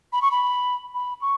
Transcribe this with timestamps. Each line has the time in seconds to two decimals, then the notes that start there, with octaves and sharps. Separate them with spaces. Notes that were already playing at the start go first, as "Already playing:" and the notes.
0.13 B5
0.22 C#6
0.31 B5
0.95 B5
1.21 C#6